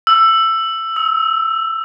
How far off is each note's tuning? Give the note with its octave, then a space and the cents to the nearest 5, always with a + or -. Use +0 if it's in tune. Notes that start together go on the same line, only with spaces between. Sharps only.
E6 +15
E6 -35